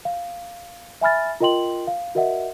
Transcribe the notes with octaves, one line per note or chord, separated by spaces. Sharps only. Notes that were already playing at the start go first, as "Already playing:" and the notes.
F5
E5 G#5 B5 F6 A6
F4 A#4 D#5 G5 C6 F#7
F5
F#4 A#4 D#5 E5 F#5